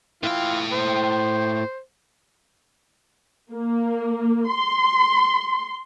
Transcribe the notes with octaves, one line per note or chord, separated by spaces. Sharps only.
A2 E3 F4 G5
C5
A#3
C6